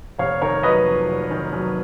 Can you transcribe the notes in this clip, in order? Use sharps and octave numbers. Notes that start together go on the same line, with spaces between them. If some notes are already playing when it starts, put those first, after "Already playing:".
F1 C#5 F5
D#3 A#4 C#5
F#3 B4 D#5
F2
F1
D#3
F#3